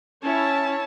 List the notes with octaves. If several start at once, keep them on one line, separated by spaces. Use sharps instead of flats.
C#4 E4 C#5 A5